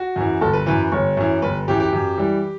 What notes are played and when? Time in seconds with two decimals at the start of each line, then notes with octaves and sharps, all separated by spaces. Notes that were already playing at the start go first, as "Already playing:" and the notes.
Already playing: F#4
0.16 F#2 E3
0.41 G1 A4
0.54 B4
0.66 F#2 E3 B4
0.92 G1 C#5
1.17 F#2 E3
1.42 G1 B4
1.68 F#2 E3 G4
1.80 G4
1.93 F#2
2.17 E3 G3